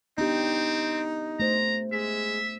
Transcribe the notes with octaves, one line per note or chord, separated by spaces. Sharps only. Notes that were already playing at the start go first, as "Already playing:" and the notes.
B3 C4 D4 D#4 G4
A3 C5 A#5
G#3 E5